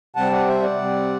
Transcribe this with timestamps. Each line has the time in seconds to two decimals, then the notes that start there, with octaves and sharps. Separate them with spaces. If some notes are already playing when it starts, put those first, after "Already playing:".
0.16 C3 G3 C4 F#5 A5
0.32 D5 F#5
0.47 C5 E5
0.63 D5 F#5
0.78 C3 G3 C4